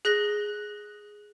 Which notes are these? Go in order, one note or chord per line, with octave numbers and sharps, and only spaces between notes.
G#4 F#6 A#6 G7